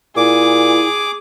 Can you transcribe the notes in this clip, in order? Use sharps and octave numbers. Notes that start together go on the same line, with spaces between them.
A#2 E4 G#4 D6